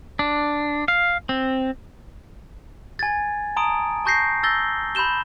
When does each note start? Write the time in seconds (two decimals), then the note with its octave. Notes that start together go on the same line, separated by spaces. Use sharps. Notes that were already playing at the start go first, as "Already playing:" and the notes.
0.19 D4
0.88 F5
1.29 C4
2.99 G#5 G#6 A6
3.56 A5 A#5 C6 D#6 D7
4.05 A5 C#6 G6 A#6 C7
4.43 E6 G6 A6 A#6 G7
4.95 B5 C6 G6 E7 G7